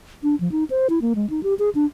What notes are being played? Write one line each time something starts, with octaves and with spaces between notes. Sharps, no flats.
D4
F3
D#4
C5
E4
A#3
G#3
D#4
G4
G#4
D4